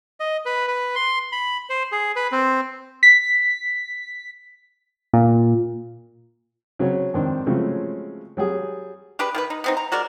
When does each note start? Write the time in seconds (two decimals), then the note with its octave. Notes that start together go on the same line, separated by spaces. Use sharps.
0.20 D#5
0.45 B4
0.68 B4
0.95 C6
1.32 B5
1.69 C5
1.92 G#4
2.16 B4
2.32 C4
3.03 B6
5.13 A#2
6.79 C#3 F#3 C4 C#4
7.14 F2 G#2 D#3 C4 D4
7.46 C#3 F3 F#3 G#3 A3 C4
8.37 F#3 G3 G#4
9.19 D4 G4 G#4 B4
9.35 D#3 G4 B4
9.50 D#4
9.64 B3 C4 D#4
9.77 A#5
9.92 G#3 F#4 A#4 D5